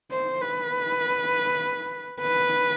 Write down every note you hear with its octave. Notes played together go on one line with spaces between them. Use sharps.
C5
B4
B4